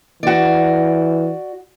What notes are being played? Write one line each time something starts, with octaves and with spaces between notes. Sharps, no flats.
E3 F#4 D5